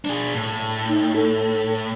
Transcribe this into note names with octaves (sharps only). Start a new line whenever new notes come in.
D4 G#4
A2
D#4
A4